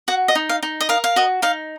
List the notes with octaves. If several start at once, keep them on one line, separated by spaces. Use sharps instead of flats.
F#4 F#5
D#5
D#4
F5
D#4
D#5
A#4 F5
F5
F#4 D#5
D#4 F5